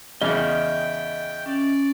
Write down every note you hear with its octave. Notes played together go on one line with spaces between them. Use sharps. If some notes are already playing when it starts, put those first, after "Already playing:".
E2 C#3 D#5 E5 G5 F6
C#4 D5